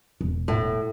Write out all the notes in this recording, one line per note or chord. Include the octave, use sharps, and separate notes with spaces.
E1
A2